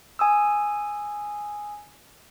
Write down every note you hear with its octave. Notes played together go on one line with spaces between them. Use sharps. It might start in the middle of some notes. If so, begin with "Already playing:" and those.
G#5 D#6 E6